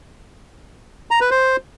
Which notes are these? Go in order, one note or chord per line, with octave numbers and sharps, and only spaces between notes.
A#5
B4
C5